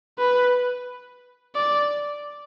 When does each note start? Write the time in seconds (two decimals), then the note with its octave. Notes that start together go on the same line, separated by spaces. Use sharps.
0.19 B4
1.55 D5